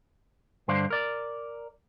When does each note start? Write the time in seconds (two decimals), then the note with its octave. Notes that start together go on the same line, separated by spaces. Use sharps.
0.68 G2 D3 C5 D5 F5
0.90 A#4 D5